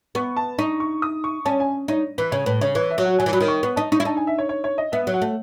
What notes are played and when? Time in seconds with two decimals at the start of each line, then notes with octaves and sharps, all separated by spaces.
0.15 B3 C#6
0.36 A5
0.59 D#4 C#6
0.80 C#6
1.02 D#6
1.24 C#6
1.45 C#4 A5
1.60 G#5
1.88 D#4 C#5
2.18 E3 B4
2.32 C#3 C#5
2.46 A2 B4
2.61 C#3 C#5
2.75 E3 C#5
2.90 E5
2.98 F#3
3.05 F#5
3.18 F#3 G#5
3.26 E3
3.33 F#3 B5
3.40 D#3
3.48 C#6
3.63 B3 C#6
3.76 D#4 A5
3.92 D#4 C#6
4.00 E4
4.05 D#4 A5
4.17 G#5
4.27 E5
4.38 C#5
4.49 C#5
4.64 C#5
4.78 D#5
4.92 B3 E5
5.07 F#3
5.14 F#5
5.21 A3